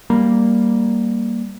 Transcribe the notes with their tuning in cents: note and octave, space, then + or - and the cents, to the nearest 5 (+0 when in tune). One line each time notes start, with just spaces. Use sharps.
G3 +0 A#3 +0